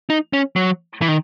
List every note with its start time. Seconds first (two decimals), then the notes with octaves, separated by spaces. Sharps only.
0.10 D#4
0.33 C#4
0.56 F#3
1.02 E3
1.08 D#3